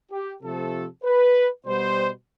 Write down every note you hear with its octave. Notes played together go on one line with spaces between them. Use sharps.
G4
C3 F3 A3 A4
B4
B2 G3 B3 C5